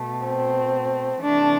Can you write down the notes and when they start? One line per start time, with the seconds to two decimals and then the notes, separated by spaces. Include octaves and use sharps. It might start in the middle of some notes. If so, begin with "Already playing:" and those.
Already playing: B2 A3
0.24 C4
1.22 C3 E3 A3 D4